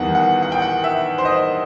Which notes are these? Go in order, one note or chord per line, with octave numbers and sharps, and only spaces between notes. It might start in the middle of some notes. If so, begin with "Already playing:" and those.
Already playing: E2 D#3 G3 B3 F#5
F#5
F#5
G5
F#5
E5
C5
D#5